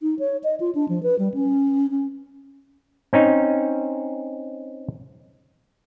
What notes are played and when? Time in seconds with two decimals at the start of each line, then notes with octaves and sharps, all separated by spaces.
0.02 D#4
0.19 C#5
0.44 D#5
0.60 F4
0.75 D4
0.89 F3
1.03 B4
1.19 G3
1.34 C#4
1.91 C#4
3.13 C4 C#4 D#4 C#5